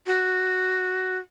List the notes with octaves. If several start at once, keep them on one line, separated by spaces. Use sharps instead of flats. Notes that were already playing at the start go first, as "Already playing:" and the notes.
F#4